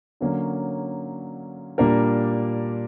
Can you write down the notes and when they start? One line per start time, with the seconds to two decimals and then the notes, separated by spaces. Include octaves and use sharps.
0.21 D3 F#3 A#3 C#4
1.78 A#2 G3 A#3 D4 A#4